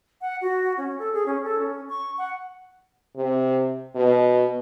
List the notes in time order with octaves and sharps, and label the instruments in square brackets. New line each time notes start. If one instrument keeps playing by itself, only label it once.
[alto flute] F#5
F#4
C#4
A4
G#4
C#4
A4
C#4
C#6
F#5
[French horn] C3
B2